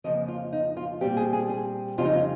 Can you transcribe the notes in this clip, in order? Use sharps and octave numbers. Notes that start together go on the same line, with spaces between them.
F2 C#3 F3 A#3 D#5
F4
D#4
F4
A#2 G3 C4 G4
G#4
G#4
G#4
F2 C#3 G3 C#4 F4
D#4
F4